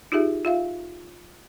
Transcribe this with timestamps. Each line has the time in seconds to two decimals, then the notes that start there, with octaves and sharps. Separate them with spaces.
0.12 D#4 F4 G4 G#4 E5
0.45 F4 E5 F5